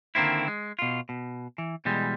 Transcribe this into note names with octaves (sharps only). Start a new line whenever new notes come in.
D3 D#3 A#3 C4 E4
G#3
B2 F4
B2
E3
B2 E3 G3 G#3